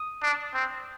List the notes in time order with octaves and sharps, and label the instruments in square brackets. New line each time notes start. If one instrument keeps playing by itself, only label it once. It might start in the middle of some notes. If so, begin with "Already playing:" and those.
Already playing: [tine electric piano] D#6
[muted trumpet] D4
C4